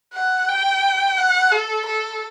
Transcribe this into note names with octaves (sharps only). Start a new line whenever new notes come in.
F#5
G5
F#5
A4
A4